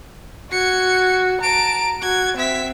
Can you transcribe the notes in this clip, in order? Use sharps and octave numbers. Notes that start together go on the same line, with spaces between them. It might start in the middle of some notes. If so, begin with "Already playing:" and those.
F#4 G#6 C#7
A5 A#5 D7
F#4 G#6
C4 E5 B6